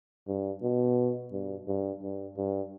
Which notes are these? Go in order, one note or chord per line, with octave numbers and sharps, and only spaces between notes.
G2
B2
G2
G2
G2
G2